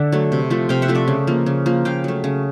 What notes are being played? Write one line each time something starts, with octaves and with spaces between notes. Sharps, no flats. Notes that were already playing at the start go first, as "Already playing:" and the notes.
Already playing: D3 D5 E5 F#5
F#3 A3
C3
F3 A3
C3 F5 G5
E5 F#5
F3 A3
D5 E5
C#3
F3 A#3
C#3
F3 A#3
C#3 F5 G5
F#3 A3
C#3